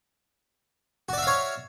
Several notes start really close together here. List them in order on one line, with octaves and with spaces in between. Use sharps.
F#4 D5 E5 F5 C#5